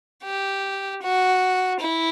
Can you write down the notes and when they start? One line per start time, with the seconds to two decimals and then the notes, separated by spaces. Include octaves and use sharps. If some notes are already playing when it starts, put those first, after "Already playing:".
0.23 G4
1.02 F#4
1.80 E4